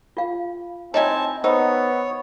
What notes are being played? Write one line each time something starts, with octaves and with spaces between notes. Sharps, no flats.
F4 F5
C4 D#4 E4 C#5 G#5 A5
B3 D#4 C5 C#5 E6